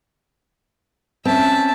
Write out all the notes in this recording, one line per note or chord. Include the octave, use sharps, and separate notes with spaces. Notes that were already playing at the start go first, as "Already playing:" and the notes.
C4 C#4 E5 A5